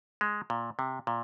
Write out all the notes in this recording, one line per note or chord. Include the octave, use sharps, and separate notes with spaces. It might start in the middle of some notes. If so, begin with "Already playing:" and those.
G#3
A#2
C3
A#2